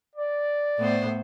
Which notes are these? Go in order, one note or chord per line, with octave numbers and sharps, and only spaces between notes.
D5
A2 B3 C5